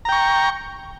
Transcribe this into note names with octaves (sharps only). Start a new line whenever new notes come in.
G5 A#5 C#6